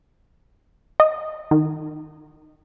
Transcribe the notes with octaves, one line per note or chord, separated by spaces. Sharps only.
D#5
D#3